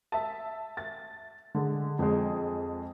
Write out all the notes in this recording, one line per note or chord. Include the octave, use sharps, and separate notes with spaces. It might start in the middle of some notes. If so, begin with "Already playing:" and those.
E5 A5
A6
D3 G#3
F2 G#3